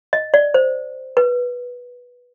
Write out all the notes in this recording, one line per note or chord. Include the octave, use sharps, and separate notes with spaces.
D#5
D5
C5
B4